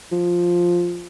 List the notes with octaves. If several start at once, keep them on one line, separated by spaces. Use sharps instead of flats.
F3